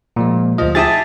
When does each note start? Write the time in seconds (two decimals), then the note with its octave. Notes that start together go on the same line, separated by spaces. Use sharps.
0.16 A#2 F3 G#3
0.58 D2 F3 D#5
0.75 E4 G4 G#4 A5 D#6 A6